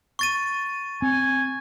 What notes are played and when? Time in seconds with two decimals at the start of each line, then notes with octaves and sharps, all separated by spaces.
0.19 C#6 A6 D#7
1.02 C4 G#5